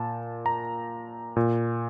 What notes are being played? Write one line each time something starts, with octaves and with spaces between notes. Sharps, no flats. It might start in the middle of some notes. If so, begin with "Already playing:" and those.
Already playing: A#2 A5
A#5
A#2